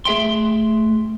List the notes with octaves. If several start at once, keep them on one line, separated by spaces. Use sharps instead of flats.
A3 G#4 E5 G5 C6